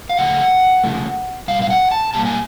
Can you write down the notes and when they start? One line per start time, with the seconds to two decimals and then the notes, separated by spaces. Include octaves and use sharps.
0.10 F5
0.17 C#3 F3 A3 F#5
0.84 C#3 F3 A3
1.48 B2 G3 F5
1.62 F5
1.70 F#5
1.91 A5
2.14 B2 G3 A#3 A5
2.25 G#5